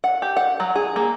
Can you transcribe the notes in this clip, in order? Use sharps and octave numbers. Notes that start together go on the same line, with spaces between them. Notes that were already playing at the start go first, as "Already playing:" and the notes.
F#5
G4
F#5
F#3
G#4
A#3